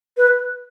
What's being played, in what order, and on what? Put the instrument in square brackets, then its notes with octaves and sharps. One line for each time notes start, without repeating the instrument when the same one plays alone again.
[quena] B4